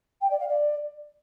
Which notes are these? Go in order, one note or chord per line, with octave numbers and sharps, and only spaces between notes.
G5
D5
F5
D5